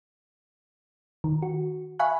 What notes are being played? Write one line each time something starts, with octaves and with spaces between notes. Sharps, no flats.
D#3
F#4
E5 F5 G#5 B5 C#6 F#6